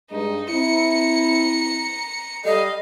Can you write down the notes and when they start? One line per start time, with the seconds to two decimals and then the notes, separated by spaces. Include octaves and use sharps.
0.11 G2 G#3 D#4
0.50 C4 E4 A#5 C#7
2.45 G3 A4 D#5 F5